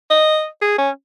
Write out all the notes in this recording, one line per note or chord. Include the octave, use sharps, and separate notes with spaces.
D#5
G#4
C#4